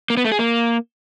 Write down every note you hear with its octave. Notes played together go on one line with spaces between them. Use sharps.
A#3
B3
A3
G#4
A#3